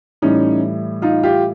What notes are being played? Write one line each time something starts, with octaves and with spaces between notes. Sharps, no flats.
A2 E3 G3 C#4 D#4
D#4 F4
F4 G4